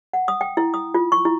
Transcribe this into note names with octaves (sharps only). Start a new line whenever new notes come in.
F#5
D#6
G5
E4
D#6
F4
C#6
E4